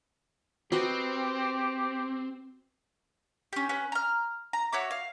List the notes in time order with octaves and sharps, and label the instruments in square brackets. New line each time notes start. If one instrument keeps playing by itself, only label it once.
[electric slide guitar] C4 [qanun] F#4 B4 D#5 [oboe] G4
[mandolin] C#4 G4
C#4 B4
A#5 F6
A#5
F#4 C#5 E5 D6
F5